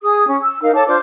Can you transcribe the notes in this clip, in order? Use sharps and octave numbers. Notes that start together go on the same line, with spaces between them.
G#4 D#6
C#4
E6
D#4 A#4 F5
A4 C#5 A5 D6
D4 F4 C5 D6